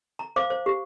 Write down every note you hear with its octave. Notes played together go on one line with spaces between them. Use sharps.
A#5
C5 F5 D6
C5
G4